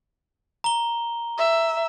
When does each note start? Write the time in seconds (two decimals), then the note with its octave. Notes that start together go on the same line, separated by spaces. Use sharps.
0.64 A#5 G7
1.38 E5